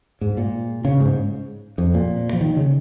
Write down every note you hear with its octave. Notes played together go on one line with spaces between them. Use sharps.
G#2
A#2
C#3
G#2
F2
A#2
F3
D#3
C#3